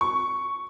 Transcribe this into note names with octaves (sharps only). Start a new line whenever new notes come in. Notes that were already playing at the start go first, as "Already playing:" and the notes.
C#6